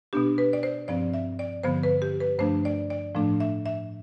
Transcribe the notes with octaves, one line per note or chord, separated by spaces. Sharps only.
B2 B3 D4 G4
B4
D5
C5
G2 F3 C4 D5
E5
D5
G2 D3 F3 B3 C5
B4
G4
B4
G2 F3 A3 D4 C5
D5
D5
A2 F3 A3 D4
E5
E5